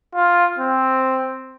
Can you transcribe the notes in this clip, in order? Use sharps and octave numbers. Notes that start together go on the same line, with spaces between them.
F4
C4